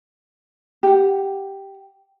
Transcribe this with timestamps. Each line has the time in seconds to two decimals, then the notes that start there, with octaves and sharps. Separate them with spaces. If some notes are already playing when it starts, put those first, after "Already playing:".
0.83 G4 F#5